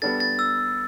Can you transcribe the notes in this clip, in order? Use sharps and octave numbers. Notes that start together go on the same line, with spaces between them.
G3 B3 D4 A4 A6
A6
E6